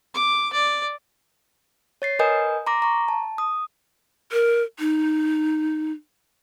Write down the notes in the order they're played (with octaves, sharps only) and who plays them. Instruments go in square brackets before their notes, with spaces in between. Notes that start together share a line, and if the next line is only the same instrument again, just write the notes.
[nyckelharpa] D6
D5
[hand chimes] C#5 A6 C7
A#4 B4 D#5 G#5 D#6 G6
A#5 C6 D6 A#6
A#5 C#6
A5
D#6
[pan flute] A#4
D#4